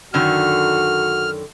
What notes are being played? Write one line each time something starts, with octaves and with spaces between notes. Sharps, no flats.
F#2 D3 D#3 F#4 F6